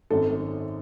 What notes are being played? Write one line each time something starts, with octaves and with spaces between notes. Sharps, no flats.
G#1 F#2 D#3 A4